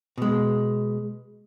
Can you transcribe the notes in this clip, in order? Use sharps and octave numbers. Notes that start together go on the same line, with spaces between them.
B2 G#3